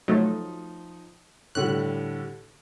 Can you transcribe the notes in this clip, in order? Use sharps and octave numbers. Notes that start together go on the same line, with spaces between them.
F3 F#3 A3 D#4
A2 D3 G3 F#6